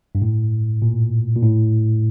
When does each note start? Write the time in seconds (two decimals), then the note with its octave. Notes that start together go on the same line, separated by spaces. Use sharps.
0.15 G2
0.22 A2
0.82 A#2
1.36 A#2
1.43 A2